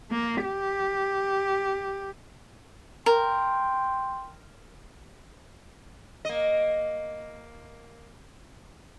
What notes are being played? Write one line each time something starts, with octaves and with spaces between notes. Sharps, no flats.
A#3
G4
A#4 G5 C6
A#3 D#5